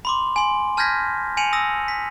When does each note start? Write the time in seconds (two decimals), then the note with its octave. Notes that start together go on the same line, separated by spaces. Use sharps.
0.05 B5 C6 D6
0.36 G#5 C6
0.77 A5 F6 G6 G#6 A#6 B6
1.37 G#5 C#7 D#7 F7 F#7
1.53 D#6 E6 A#6
1.88 B6